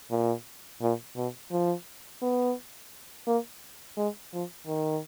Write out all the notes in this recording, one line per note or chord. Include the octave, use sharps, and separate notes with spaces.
A#2
A#2
B2
F3
B3
A#3
G#3
F3
D#3